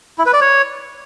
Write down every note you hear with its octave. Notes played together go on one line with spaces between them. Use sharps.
E4
B4
D5
C#5